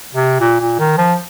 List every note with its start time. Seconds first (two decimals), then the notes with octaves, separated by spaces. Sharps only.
0.15 C3
0.40 A#2
0.60 A#2
0.79 D#3
0.98 F3